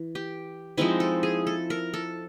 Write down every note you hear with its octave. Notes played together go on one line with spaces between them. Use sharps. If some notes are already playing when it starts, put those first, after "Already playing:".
Already playing: E3
G4
F3 G#3 C4 D#4 E4
A4
G#4
A4
A#4
A4